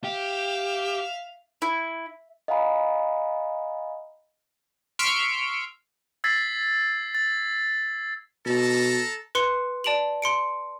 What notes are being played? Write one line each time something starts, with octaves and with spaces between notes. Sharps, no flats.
G4 E5 F5
E4
D#5 F5 F#5 G#5 A#5 B5
C6 C#6 E6 F6 B6 D7
E6 G#6 A6 B6 C7
A6
B2 A4 A5 A#5
B4 C6 C#7
D5 A5 D7 F7 F#7
C6 C#7 D7